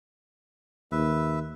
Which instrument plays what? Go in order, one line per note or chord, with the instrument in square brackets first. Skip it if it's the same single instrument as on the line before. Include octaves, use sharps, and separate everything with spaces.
[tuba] D#2 [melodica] B4 E5